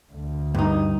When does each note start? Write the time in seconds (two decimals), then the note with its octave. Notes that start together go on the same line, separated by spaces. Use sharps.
0.13 D2
0.55 G2 D#4